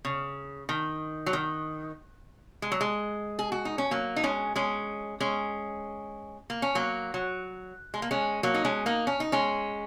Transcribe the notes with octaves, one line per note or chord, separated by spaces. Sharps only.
C#3
D#3
F#3
D#3
G#3
F#3
G#3
G#4
F#4
D#4
C#4
F#3 A#3
D#4
G#3 C#4
G#3 C#4
G#3 C#4
A#3
C#4
F#3 A#3
F#3
G#3
A#3
G#3 C#4
F#3 A#3
D#4
G#3 C#4
A#3 D#4
C#4
D#4
G#3 C#4